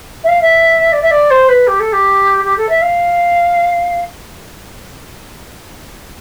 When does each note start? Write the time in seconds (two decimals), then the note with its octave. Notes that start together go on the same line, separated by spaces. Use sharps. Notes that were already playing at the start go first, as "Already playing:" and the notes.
0.23 E5
0.28 F5
0.41 E5
0.92 D5
1.02 E5
1.11 D5
1.30 C5
1.48 B4
1.67 G4
1.79 A4
1.92 G4
2.44 G4
2.57 A4
2.69 E5
2.81 F5